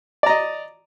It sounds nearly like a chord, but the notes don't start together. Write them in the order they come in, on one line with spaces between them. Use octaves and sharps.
D5 A#5 D#5